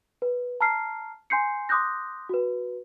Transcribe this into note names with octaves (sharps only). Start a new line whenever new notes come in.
B4
A5 A#5 F6 C7
G#5 C6 G6 C7 C#7
C6 D6 D#6 F#6 G6 A#6
F#4 B4